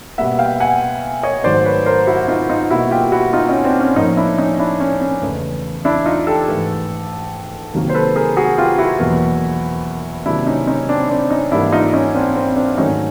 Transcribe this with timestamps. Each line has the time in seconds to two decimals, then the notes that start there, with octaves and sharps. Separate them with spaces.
0.18 B2 G3 A#3 E5 F#5
0.39 F5 G5
0.60 F#5 G#5
1.23 C#5 D#5
1.44 G#2 D#3 F#3 A3 C5 D5
1.65 B4 C#5
1.86 A#4 C5
2.07 E4 F#4
2.28 D#4 F4
2.49 D#4 F4
2.70 B2 G3 A#3 E4 F#4
2.91 F4 G4
3.12 E4 F#4
3.33 D#4 F4
3.49 C#4 D#4
3.64 C4 D4
3.80 C#4
3.96 A2 F3 A#3 C#4 D#4
4.17 D4 E4
4.38 C#4 D#4
4.59 D4 E4
4.80 C#4
5.01 C#4
5.22 E2 C#3 E3 A3
5.85 D4 E4
6.06 D#4 F4
6.27 G4 A4
6.48 G#2 E3 A3
7.74 C3 D#3 F#3 A#3
7.90 C5
7.94 A4 B4
8.16 G#4 A#4
8.37 F#4 G#4
8.58 F4 G4
8.79 E4 F#4
8.99 E2 B2 F#3 A#3
10.26 C3 D#3 F#3 A#3 D4 E4
10.47 C#4 D#4
10.67 C#4 D#4
10.88 C4 D4
11.09 C4 D4
11.30 C#4 D#4
11.51 G#2 E3 G3 A#3 D4 E4
11.72 D#4 F4
11.93 C#4 D#4
12.15 C4 D4
12.36 C4
12.56 C4 D4
12.77 G#2 D#3 F#3 A3 C#4 D#4